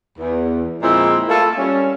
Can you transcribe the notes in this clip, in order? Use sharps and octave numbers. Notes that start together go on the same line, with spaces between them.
E2
A#2 F3 G#3 C4 E4
A3 A#3 E4 F4 A4
G3 C#4